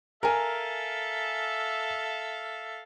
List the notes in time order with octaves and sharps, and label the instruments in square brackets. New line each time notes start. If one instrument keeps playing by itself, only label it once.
[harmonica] A4 E5 F5 [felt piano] A#4 G#5